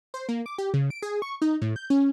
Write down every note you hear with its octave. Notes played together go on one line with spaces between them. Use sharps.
C5
A#3
D6
G4
C#3
D7
G#4
C#6
D#4
A2
G6
C#4